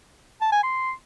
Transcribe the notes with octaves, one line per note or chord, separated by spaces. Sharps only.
A5
G#5
C6